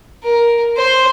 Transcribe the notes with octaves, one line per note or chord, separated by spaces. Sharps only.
A#4
C5